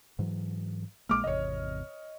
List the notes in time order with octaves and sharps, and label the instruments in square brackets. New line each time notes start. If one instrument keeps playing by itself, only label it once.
[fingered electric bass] G#2 E3 F#3
[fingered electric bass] A#1 G#3 A#3 [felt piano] D6 F6
[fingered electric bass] G#1 E2 C3 [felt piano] C#5 D#5